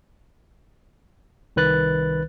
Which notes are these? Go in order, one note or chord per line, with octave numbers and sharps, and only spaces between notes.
C2 D#3 B4 F#6 A6